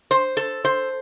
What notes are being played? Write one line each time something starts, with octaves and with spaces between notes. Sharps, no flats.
C5
A4
C5